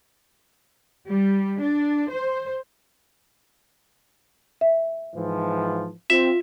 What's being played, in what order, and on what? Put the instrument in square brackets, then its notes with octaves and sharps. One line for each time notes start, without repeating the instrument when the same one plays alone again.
[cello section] G3
D4
C5
[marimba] E5
[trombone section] G#2 E3 F3
[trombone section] C4 [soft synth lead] F4 [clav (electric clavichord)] E5